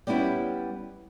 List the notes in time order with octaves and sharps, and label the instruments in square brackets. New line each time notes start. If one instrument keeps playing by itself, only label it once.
[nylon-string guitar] G3 B3 C#4 E4 G4